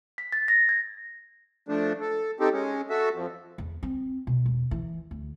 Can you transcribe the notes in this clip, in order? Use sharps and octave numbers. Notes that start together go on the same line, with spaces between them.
B6
A6
A#6
G#6
F3 A3 D4
A4
C4 D#4 G4 A4
G#3 C#4
F#4 A4 E5
F2
E2
C4
B2
E1
E3
D2